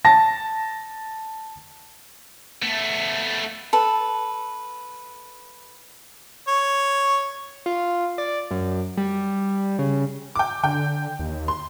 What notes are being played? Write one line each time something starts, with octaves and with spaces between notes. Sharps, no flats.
A5 A#6
A3 B3
A4 B4
C#5
F4
D5
F#2
G3
C#3
G5 D6
D3 G5
D#2
C6